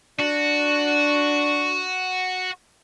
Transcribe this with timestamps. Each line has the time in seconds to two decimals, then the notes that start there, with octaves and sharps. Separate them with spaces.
0.19 D4 F#4